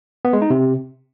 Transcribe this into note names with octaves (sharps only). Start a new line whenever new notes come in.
B3
G#3
D#4
C3